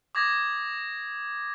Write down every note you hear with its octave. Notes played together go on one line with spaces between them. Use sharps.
D6 D#6 G#6 A#6